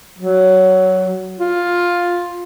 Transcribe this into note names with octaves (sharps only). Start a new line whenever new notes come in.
F#3
F4